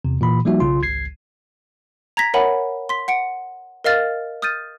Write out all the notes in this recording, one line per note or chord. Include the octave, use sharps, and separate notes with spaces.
E2 C3
A#2 E3 B5
F3 G3 A#3 D#4 F#4 E5
B1 C#3 F4 C6
G#1 C#2 G#6 C7
A#5 G#6 A#6 B6
A#4 C#5 E5 F#5 G#5 B5
C6 B6
F#5 C#7 D7
A#4 D#5 F5 F6 A6
D#6 F6 G6 A6 D#7